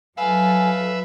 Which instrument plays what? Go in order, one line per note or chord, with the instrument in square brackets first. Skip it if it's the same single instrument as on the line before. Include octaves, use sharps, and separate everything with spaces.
[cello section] F#3 A4 [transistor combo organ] B4 E5 [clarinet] F5 [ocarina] G#5